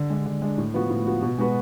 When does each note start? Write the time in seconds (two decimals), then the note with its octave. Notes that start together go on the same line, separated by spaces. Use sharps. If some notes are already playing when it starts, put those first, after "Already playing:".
Already playing: D3
0.10 G#3 D4
0.26 D3
0.42 G#3 D4
0.58 A2
0.74 F3 B3 F#4
0.90 A2
1.06 F3 B3 F#4
1.22 B2
1.38 G#3 B3 F#4 B4